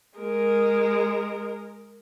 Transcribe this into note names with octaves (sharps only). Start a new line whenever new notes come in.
G#3 A#4